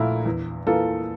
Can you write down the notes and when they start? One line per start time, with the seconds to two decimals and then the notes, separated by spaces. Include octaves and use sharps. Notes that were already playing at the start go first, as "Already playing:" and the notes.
Already playing: A#1 A#2 A3 E4 A#4
0.26 E2
0.67 E3 A#3 F4 A4